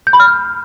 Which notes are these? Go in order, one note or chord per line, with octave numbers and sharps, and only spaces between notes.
G6
B5
F6